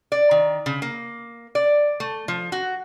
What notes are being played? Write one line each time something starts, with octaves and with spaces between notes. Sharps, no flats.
D5
D#3
C#3
A#3
D5
A3
F3
F#4